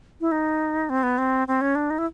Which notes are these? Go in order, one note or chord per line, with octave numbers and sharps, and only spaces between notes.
E4
D#4
C4
B3
C4
C4
C#4
D4
D#4
E4